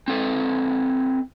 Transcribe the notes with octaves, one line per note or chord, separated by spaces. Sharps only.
C4 A4 B4